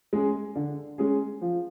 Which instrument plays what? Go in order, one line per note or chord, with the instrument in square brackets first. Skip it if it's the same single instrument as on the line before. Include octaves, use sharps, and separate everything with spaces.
[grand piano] G#3 C#4 G#4
D3
G#3 C#4 G#4
F3